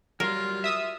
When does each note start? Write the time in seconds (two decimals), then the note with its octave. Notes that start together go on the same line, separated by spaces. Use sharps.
0.20 F#3 G3 F4 A#4
0.64 E5 D#6 E6